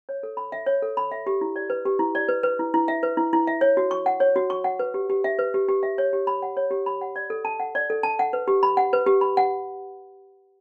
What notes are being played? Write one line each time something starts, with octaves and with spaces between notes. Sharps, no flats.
C#5
A4
B5
E5
C#5
A4
B5
E5
G4
E4
D5
B4
G4
E4
D5
B4
B4
E4
E4
E5
B4
E4
E4
E5
C#5
F#4
C#6
F#5
C#5
F#4
C#6
F#5
B4
G4
G4
E5
B4
G4
G4
E5
C#5
G4
B5
F#5
C#5
G4
B5
F#5
D5
A4
A5
F#5
D5
A4
A5
F#5
B4
G4
B5
F#5
B4
G4
B5
F#5